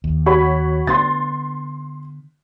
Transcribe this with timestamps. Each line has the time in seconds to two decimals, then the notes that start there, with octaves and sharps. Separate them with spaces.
0.04 D#2
0.26 F#4 C#5 B5
0.87 D3 B3 C6 A6